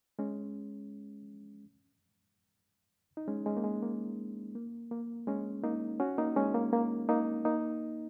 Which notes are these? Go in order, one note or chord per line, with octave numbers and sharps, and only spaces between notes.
G#3 C#4
D#4
G#3 C#4
G#3 C#4
A#3
G#3
A#3
A#3
A#3
G#3 C#4
A#3 D#4
C#4 F#4
A#3 D#4
G#3 C#4
A#3
A#3
A#3 D#4
A#3 D#4